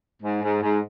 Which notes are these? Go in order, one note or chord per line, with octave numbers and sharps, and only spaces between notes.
G#2
G#2
G#2